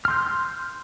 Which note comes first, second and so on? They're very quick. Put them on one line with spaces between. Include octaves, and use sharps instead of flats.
F6 C6 G6